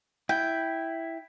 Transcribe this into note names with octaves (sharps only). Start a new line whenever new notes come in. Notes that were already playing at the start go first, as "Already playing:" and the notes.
E4 G5